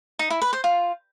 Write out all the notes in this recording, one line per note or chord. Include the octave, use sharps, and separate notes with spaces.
D#4
E4
B4
C5
F4